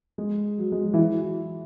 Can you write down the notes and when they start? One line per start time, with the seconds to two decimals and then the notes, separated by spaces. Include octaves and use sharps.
0.18 G#3
0.58 F#3
0.72 G#3
0.85 F#3
0.94 E3
0.99 F#3